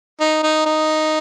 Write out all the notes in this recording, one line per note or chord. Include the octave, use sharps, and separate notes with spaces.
D#4
D#4
D#4